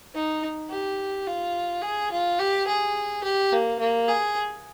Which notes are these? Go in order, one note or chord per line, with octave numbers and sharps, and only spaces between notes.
D#4
G4
F4
G#4
F4
G4
G#4
G4
A#3
A#3
G#4